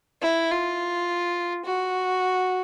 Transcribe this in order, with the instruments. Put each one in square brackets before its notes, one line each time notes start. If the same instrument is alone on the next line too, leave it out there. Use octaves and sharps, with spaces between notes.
[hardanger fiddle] E4
F4
F#4